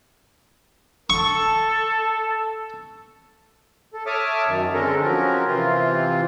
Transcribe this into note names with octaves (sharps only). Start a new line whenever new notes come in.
A4 C#6
A4
C#5 E5 A5 D6 D#6 F6
F#2 D#3
D3 G#3 C4 C#4 A4 A#4
F3 F#3 C4 C#4 A#4
C3 E3 C4 F4